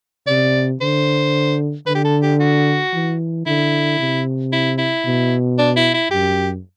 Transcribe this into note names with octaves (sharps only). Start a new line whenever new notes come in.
C3 D5
D3 C5
D3 B4
G4
A4
G4
F#4
E3
D3 E4
C3
E4
E4
B2
D4
E4
E4
F#2 G4